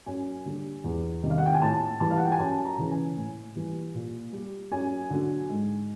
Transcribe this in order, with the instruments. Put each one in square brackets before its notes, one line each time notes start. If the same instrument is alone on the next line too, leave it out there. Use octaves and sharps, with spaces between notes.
[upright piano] F#2 G#5
D3 G3
E2
C3 D#3 G3
F5
F#5
G5
G#5
A2 A5
E3 G3 A5
F5
F#5
G5
G#5
F#2 A5
A#5
C#3 E3
G#5
A2
E3 G3
A#2
G3
F#2 G#5
D3 F#3
G#2